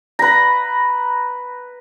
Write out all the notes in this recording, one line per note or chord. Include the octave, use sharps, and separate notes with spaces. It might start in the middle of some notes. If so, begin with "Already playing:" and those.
B4 A#5